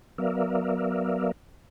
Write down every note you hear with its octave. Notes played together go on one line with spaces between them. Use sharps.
F#3 B3 A#4 D5 E5 F5